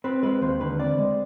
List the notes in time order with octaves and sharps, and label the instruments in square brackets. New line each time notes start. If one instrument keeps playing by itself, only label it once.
[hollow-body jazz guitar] C4 B4
G#3 B4
D#2 C5
D3 B4
C4 D5
G#3